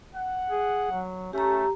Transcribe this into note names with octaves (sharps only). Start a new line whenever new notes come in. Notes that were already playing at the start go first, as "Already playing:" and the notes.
F#5
G#4
F#3
A3 C#4 G4 A#5